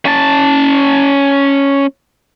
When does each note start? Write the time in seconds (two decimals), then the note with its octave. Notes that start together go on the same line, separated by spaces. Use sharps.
0.06 C#4 A5